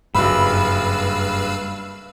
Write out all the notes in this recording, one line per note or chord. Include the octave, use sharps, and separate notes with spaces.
F#1 G2 G3 B4 F5 B5 E6